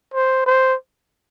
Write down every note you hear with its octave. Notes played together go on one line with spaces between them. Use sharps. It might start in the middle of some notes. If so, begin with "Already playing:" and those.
C5
C5